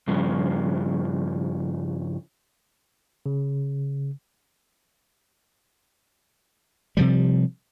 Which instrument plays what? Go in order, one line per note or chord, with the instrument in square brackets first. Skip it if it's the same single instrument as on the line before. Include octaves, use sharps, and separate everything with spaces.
[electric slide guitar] G2 C#3 F3
[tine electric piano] C#3
[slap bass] C3 F3 G3